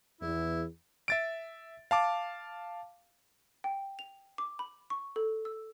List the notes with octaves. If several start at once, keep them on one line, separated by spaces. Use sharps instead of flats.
E2 E4
E5 A6 D7
F5 A5 D6
G5
F7
D6
B5
C#6
A4
E6